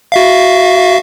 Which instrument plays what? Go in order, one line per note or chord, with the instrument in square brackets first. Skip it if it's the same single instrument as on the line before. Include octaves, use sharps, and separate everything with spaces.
[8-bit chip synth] F#4 E5 F5